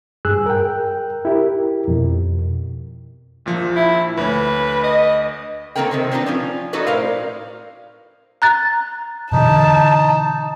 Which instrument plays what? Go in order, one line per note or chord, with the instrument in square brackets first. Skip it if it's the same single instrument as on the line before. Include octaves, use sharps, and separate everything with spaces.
[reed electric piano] G2 G#4 E6 F#6
A#4 G5
E4 G4 A#4
F2 B2
[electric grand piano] A#1 A#2 F3
[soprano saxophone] E4
[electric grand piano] D2 C#5 [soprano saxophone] B4
[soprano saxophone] D#5
[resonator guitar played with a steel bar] D#3 A#3 C4 A4 A#4 G5
C3 D#3 C5
C4 D4 D#4 F4 B4
F3 C#4 F4
D#4 E4 F#4 A4 B4 D5
A2 A#4 C5 F5
[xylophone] A#5 F#6 A6
[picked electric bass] B2 D3 E3 [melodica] D#4 [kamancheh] A5